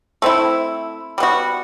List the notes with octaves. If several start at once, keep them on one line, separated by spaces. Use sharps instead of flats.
A3 C4 E4
G3 B3 F#4